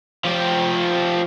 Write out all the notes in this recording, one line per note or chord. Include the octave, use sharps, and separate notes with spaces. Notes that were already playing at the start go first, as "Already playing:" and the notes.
F3 G4